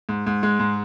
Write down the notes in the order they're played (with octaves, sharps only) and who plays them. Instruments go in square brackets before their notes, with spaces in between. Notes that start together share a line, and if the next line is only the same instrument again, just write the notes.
[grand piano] G#2
G#2
G#3
G#2